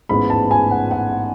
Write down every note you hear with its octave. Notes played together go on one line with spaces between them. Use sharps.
A1 G#2 G#3 B3 B5
A5
G#5
F#5
F#5